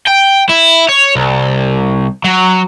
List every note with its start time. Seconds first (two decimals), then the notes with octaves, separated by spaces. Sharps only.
0.07 G5
0.49 E4
0.89 C#5
1.16 C2
2.24 F#3